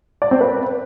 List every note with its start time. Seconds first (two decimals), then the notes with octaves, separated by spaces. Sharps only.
0.22 D5
0.31 C4
0.41 B4